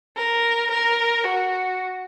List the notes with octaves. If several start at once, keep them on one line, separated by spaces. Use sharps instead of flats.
A#4
A#4
F#4